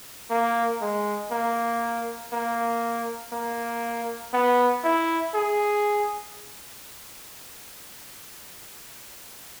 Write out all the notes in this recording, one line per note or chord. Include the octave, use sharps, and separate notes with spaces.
A#3
G#3
A#3
A#3
A#3
B3
E4
G#4